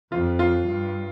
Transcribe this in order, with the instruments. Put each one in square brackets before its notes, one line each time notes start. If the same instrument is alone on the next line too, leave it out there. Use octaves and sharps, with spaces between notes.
[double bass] F2 [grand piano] F4
[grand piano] F4
[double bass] G2